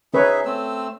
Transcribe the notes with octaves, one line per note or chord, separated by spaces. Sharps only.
C#4 D#4 G#4 B4 C#5 E5
A3 C4 E6